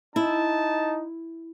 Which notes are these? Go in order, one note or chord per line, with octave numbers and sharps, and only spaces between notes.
D#4 E4 A5